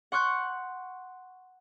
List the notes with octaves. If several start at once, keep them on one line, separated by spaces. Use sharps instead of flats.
F#5 C6 C#6 F#6 G6